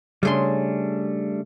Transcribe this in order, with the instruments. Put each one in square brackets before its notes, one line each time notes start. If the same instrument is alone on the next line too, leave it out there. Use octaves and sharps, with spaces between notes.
[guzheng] C#3 G#4 C6 [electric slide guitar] G3 A3 D4